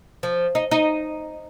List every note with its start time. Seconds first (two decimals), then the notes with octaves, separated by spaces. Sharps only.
0.23 F3
0.55 D#4
0.71 D#4